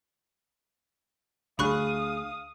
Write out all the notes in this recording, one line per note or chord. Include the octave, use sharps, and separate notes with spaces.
D2 D4 G#4 F5 B5 C#6 D#6 F#6